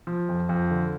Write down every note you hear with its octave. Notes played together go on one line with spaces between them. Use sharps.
F3
F2
F2
D3